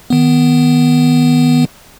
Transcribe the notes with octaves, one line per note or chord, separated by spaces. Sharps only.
D#3 B3